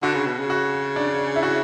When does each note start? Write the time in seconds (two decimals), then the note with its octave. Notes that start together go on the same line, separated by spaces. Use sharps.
0.02 D3 F#4
0.14 C#3
0.27 B2
0.39 C#3
0.50 F#4
0.96 D4
1.36 E4
1.43 F#4